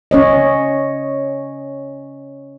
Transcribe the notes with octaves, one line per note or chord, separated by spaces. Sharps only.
C#4 C#5 D#5